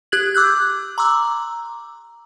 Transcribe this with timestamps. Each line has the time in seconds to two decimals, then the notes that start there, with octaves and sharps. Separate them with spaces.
0.12 G4 F#6 G#6 F#7
0.34 D6 E6 F#6 G6
0.98 A#5 C6 D6 E6